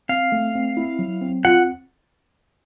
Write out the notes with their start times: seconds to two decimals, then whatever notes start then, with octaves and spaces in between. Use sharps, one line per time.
0.09 C4 F5
0.32 A3
0.55 C4
0.77 E4
0.99 F#3
1.21 C4
1.45 F4 F#5